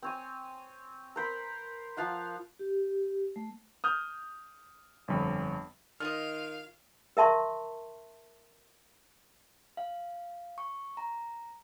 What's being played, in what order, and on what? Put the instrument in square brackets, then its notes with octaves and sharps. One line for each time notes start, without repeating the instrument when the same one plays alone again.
[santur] C4 C#5 G#5
A#4 C5 B5
F3 F4 F5 F#5
[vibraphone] G4
A3
[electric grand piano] D#6 F6 G6
G1 F2
[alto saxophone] D#3 [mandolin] F4 C#5 D#5 [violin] F5 [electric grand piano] F6
[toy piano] A#4 E5 A5 C6 C#6
[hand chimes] F5
C#6
A#5